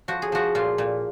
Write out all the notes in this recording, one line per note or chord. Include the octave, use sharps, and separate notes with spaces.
F3 F#4
G#4
F3 F#4
A#2 F4
A#2